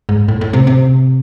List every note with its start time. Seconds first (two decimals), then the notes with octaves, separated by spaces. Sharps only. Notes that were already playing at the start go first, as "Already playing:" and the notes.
0.09 G#2
0.28 A2
0.41 A2
0.53 C3
0.67 C3